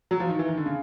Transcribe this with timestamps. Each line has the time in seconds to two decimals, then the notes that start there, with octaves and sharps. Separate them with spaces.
0.11 F#3
0.20 F3
0.29 D#3
0.39 E3
0.48 D#3
0.57 D3
0.66 C#3